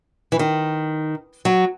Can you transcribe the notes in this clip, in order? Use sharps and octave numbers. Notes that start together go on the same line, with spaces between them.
E3
D#3
F#3